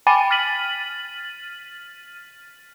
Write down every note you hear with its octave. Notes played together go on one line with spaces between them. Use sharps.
G5 G#5 B5 D6 A6 D#7
F6 A6 B6 D#7 F#7